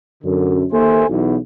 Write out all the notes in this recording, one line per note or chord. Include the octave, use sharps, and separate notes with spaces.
F#2 D3
D#2 A#3 A4 C5 E5 G#5
B1 E2